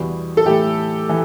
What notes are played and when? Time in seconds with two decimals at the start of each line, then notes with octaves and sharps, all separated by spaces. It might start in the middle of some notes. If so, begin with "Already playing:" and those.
Already playing: E2 B2 G3 B3 F#4
0.37 A4
0.45 A2 E3 A3 E4 G4
1.09 E3